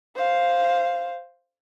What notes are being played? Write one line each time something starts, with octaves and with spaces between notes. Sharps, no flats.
C5 F5